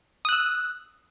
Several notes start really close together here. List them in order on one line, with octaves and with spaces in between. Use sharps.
D#6 F#6 E6